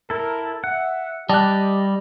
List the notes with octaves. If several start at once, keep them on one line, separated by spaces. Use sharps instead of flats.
E4 A4 A#4
E5 F#5
G3 G4 D5 D#5 A5 F#6